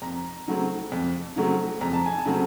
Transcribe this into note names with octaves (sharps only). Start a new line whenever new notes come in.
F2 A#5
C#3 F#3 A3 C4
F2
C#3 F#3 A3 C4
F2 A#5
A5
G#5
A5
C#3 F#3 A3 C4